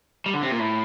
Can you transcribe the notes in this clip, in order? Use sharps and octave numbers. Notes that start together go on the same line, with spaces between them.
G3
D3
C3
A#2
A2